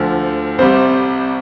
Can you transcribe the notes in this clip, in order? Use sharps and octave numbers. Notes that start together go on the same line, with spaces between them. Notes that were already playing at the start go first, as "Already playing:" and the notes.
Already playing: D2 D3 F3
C2 C3 G3 C5